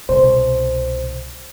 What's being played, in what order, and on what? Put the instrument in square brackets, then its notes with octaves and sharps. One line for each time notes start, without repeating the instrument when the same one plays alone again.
[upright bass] C2 B2 [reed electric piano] C5